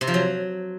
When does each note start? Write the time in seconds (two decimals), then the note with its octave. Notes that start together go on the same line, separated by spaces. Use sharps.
0.01 C3
0.07 F3
0.14 F#3